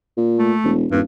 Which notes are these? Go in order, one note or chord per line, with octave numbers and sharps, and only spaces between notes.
A#2
A3
E1
D#1 G2